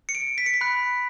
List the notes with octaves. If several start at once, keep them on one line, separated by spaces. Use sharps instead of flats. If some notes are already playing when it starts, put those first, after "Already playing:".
C#7
D7
B6
C#7
B6
B5 F#6